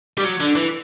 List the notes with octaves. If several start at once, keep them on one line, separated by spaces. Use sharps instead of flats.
G3
F#3
D3
E3